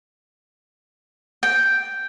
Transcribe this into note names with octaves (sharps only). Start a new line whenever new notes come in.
G5